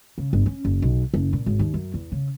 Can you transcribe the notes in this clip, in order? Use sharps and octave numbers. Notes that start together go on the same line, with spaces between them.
C#3
G1
C#4
F#1
B1
F#1
A#2
G#1
D#2
F#2
E2
C#3